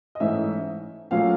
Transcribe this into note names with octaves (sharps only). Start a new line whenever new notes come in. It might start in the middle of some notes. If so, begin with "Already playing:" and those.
D#5
G#2 E3 A3 C#4 E5
A#2 F#3 A3 C#4 F5